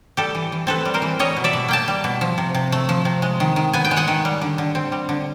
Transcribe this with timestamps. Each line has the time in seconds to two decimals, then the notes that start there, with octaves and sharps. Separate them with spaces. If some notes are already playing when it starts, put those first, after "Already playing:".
0.17 G3 G4 A4
0.35 E3
0.52 E3
0.67 C4 A4 B4
0.85 G3
0.94 A#4 C5
1.02 E3
1.19 G3 C#5 D#5
1.36 B2
1.44 D5 E5
1.53 B2
1.68 A#3 G5 A5
1.88 G3
2.04 B2
2.21 F3
2.38 C3
2.54 C3
2.72 A3
2.89 F3
3.05 C3
3.22 G#3
3.40 D#3
3.56 D#3
3.73 B3 G#5
3.85 G5
3.91 G#3
3.96 F#5 G#5
4.08 D#3
4.25 G3
4.42 D3
4.58 D3
4.75 C4
4.92 G3
5.09 D3